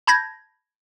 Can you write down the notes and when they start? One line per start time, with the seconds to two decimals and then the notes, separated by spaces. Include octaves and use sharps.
0.07 A5 B5 G6 G#6 A#6